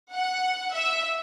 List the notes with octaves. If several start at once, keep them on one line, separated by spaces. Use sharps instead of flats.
F#5
E5